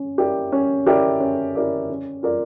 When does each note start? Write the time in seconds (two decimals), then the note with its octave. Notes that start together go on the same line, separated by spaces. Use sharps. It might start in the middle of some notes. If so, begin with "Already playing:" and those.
Already playing: C#4
0.18 E4 G4 A#4 D5
0.52 C#4
0.86 E4 G4 A#4 D5
1.20 C#4
1.55 E4 G4 A#4 D5
1.90 C#4
2.23 F4 A#4 D5